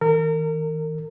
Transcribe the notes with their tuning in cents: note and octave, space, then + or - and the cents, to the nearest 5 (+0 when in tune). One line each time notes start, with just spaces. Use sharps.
D#3 +40 A#4 -30